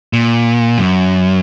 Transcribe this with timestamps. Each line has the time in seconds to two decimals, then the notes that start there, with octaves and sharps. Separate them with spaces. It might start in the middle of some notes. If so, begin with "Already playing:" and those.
0.13 A#2
0.78 F#2